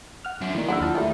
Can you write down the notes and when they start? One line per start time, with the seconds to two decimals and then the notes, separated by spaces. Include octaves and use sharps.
0.25 F#5 F6
0.42 F#3 E5
0.55 D#3 F#3 A#3 E4 D5
0.69 D3 F#5 B5 E6
0.80 D#2 E4 F4 A5 F6
0.95 G3 A3 A#5